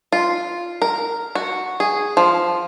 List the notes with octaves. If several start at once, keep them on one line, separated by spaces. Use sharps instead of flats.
F4
A#4
F#4
G#4
F3